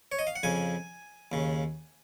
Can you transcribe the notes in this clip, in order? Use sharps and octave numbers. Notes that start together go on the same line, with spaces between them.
C#5
D#5
F5
F#5
F2 C#3 G#5
D#2 C#3